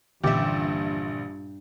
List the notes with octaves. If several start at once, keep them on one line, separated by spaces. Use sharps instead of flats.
A#1 G2 D3 E3 C#4 G4 E5